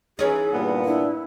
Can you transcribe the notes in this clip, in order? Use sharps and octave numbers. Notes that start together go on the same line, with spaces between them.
E3 C#4 D#4 G#4
G2 A#2 B3
D4 E4